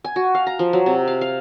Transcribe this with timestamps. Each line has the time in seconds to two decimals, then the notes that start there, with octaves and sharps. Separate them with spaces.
0.05 G#5
0.16 F#4
0.35 F5
0.47 A#5
0.59 F3
0.73 F#3
0.86 C3
1.08 F5
1.21 F5